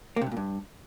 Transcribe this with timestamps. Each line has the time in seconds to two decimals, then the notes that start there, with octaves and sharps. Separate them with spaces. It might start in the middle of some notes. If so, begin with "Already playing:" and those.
0.16 A#3
0.21 C3
0.27 G2
0.32 A#2
0.37 G2